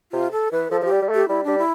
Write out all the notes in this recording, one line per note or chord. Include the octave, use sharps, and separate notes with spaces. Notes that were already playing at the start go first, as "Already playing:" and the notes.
C3 F4
A4
E3 B4
F3 A4
F3 G4 A4
G3
G3
A3
G4
G3 E4
G3 D4
E4